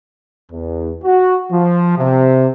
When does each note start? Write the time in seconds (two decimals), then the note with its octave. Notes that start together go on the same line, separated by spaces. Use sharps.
0.52 E2
1.03 F#4
1.51 F3
1.97 C3